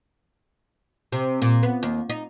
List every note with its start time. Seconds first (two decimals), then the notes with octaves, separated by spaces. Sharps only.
1.12 C3
1.42 A#2
1.63 B3
1.83 D#2
2.09 D#4